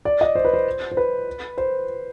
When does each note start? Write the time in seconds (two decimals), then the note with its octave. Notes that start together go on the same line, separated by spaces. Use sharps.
0.05 D5
0.21 D#5
0.35 C5
0.45 B4
0.54 C5
0.92 C5
0.97 B4
1.58 C5